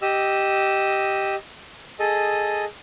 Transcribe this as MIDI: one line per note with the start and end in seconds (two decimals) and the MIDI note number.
0.02 1.35 67
0.02 1.35 75
0.02 1.35 88
1.99 2.65 68
1.99 2.65 69
1.99 2.65 75